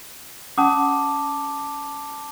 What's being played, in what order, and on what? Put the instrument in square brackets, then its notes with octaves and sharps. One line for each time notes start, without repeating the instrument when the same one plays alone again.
[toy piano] C#4 F#5 D#6 [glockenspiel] A5 D6